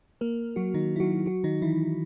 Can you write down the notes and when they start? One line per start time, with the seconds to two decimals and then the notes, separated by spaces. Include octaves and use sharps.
0.21 A#3 A#4
0.56 F#3 F#4
0.74 D#3 D#4
0.96 E4
1.00 F#3 F#4
1.26 F#3 F#4
1.44 D#3 D#4
1.62 E3 E4